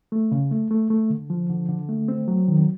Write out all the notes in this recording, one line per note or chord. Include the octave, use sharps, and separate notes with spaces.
A3
C#3
A3
A3
A3
D3
F3
D3
D3
A3
C4
F#3
D#3